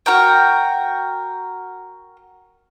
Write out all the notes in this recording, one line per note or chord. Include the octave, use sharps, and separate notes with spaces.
F#4 A#4 G5